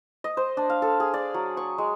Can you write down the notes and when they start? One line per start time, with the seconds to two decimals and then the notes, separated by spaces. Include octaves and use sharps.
0.24 D#5
0.37 C5
0.57 D4
0.70 F5
0.82 A4
1.00 G#4
1.14 D5
1.34 F#3
1.57 C#6
1.78 G#3